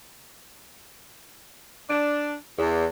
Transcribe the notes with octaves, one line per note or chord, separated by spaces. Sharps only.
D4
E2